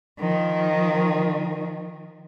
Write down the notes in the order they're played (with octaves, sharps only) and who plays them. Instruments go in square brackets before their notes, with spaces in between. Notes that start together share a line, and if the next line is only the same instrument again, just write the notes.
[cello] D#3 F3